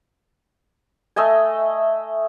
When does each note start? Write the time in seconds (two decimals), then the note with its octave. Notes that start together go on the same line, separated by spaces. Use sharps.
1.16 A3 D#5 E5 G#5